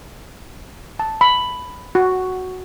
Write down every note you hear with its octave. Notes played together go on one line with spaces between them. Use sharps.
A5
B5
F#4